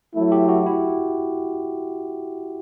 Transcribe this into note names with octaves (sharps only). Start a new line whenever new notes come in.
F#3 A3 E4
G4
F#4
E4